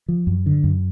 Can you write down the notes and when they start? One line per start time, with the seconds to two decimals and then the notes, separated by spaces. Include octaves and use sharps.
0.08 F3
0.27 F#2
0.46 D3
0.64 F#2